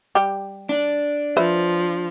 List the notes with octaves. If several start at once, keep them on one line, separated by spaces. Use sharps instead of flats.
G3 G4
D4
F3 B4 C5 E5